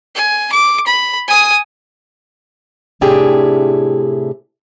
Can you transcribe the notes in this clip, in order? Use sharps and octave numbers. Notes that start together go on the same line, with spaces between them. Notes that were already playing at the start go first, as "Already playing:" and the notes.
G#5
D6
B5
G#5 D#6
A2 C3 D4 E4 G4 G#4